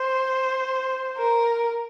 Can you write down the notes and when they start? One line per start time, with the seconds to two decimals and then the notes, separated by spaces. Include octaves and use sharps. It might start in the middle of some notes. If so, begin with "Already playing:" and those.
Already playing: C5
1.17 A#4